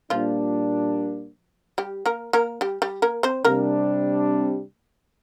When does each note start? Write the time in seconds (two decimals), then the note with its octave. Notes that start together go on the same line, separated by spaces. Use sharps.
0.10 A#2 F3 G3 A#3 D4 F4
1.78 G3 G4
2.06 A#3 A#4
2.33 A#3 A#4
2.61 G3 G4
2.82 G3 G4
3.02 A#3 A#4
3.23 C4 C5
3.45 C3 G3 A#3 D4 A#4